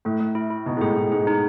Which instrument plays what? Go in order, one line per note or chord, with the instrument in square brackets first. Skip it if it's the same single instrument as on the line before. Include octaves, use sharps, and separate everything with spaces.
[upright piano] A2 [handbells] A3
[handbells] A3
E4
E4
[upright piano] B2 [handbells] D#4
[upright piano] G#2
[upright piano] A2 [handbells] G#4
[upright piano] A2 [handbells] G#4
[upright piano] G#2 [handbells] G#4
[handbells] D#4